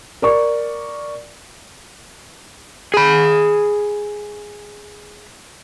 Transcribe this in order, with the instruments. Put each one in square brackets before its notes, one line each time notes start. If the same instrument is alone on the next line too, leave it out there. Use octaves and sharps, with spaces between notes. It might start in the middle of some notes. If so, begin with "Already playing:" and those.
[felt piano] A#4 D5 C#6
[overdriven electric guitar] G#4 B5